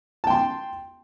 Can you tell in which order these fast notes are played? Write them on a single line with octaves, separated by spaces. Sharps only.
A5 G5 C6